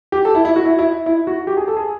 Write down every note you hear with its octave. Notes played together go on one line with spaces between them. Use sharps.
G4
A4
E4
E4
F#4
E4
E4
E4
F#4
G4
G#4
A4
G#4